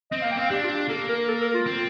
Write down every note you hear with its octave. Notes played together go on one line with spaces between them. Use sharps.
C4 D#5
A#3 F5
G5
C4 F5
D4 G4
F4
G4
A#3 A4
A#4
A4
A#4
F4
C4